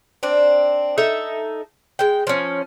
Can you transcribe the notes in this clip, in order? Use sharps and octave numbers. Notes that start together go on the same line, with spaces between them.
C4 D4
D#4 A4 E5
G#3 G5
F3 C#4